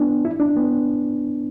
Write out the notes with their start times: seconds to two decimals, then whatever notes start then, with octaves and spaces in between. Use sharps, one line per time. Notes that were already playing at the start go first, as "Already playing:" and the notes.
Already playing: B3 D4
0.25 E4
0.40 D4
0.57 B3